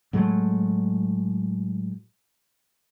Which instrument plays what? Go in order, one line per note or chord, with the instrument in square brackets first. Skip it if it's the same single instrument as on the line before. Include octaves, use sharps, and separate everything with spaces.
[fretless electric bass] A2 F#3 G#3 A3